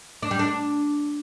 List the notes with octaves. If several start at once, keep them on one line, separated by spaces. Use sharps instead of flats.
D4
G3
D4